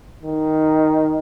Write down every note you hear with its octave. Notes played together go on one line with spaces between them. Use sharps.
D#3